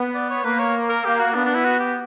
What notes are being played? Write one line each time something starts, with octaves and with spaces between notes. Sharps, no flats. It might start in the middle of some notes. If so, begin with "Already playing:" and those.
Already playing: B3
D5
C#5
A#3 B4
C#5
A#4
A#3 G4
F#4
B3 D4
D4
E4
F#4
G4